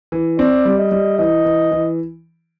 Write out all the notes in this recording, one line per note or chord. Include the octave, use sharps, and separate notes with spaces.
E3
C4 D5
G3
D#5
G3
E3 D#5
E3
E3